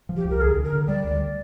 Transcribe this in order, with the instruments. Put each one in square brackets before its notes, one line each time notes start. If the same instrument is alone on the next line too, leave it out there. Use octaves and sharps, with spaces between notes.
[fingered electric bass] F3
[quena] G4
[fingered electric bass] C2
[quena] A#4
[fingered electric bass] D2 [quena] G#4
[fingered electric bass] D3
[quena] A#4
[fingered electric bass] D3
[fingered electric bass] G3 [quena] D5
[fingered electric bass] D2